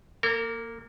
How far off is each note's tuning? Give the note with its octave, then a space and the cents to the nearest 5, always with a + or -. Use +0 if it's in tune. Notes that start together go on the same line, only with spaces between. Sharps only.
A#3 +0 A#4 -40